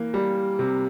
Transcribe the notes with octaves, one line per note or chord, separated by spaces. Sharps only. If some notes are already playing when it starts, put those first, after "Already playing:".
Already playing: E3 A#3
G3
C3